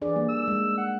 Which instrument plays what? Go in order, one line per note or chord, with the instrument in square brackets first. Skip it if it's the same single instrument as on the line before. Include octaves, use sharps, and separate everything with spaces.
[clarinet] E3 [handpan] D4 G#4 D5
[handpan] G3 A#3
[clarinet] E6
[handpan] G#3
[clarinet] F#5